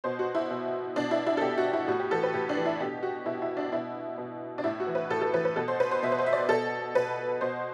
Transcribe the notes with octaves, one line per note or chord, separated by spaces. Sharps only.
B2 C5
F#4
E4
B2
B2 D4
E4
E4
A4
B2 G4
F#4
E4
A2 F#4
G4
E3 A4
B4
A2 G4
D4
E3
E4
B2 G4
F#4
B2 E4
E4
D4
B2 E4
B2
D4
A2 E4
F#4
E3
B4
A2 A4
A4
E3 B4
B4
B2 A4
C5
B4
C5
B2 E5
B4
C5
E5
D5
B2 A4
B2 B4
B2 C5